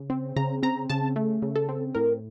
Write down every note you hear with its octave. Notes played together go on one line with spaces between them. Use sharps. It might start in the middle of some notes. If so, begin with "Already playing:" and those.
Already playing: C#3
C4
C#3 A#5
C4 A#5
C#3 A5
A3
C#3
A4
C4
A2 A#4